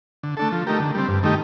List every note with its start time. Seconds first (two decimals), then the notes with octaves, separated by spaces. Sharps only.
0.23 D3
0.37 A3 D4 A4
0.52 F3
0.67 A3 D#4 G4 A#4
0.80 D3
0.95 G3 C4
1.08 G2
1.23 D#3 A3 D#4 G4